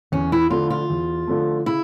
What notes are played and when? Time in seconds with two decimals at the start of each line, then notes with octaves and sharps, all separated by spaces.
0.12 E2 C#4
0.32 E4
0.50 D3 F3 A3 F4
0.70 F4
0.90 E2
1.27 D3 F3 A3
1.66 C#3 E4